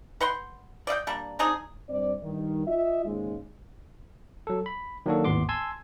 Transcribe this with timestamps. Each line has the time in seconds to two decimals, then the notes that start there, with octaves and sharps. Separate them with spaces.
0.20 B4 F#5 G5 C6
0.87 D5 D#5 F5 G5
1.07 G3 A#3 D4
1.39 C4 D4 D#4 G#4
1.90 G2 C4 D5
2.23 G2 D#3
2.68 F4 D#5 E5
3.05 D#2 G#2 C#3 G#3
4.47 F#3 A4
4.66 B5
5.06 D#3 F#3 A#3 D4 F#4 A4
5.25 G#1 D#2 A2 B3 C6 D6
5.49 G#5 A5 C6 E6 G#6